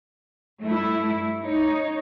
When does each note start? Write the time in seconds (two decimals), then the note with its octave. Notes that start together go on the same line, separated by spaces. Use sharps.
0.62 G2 A3 E4
1.45 D#4 C#5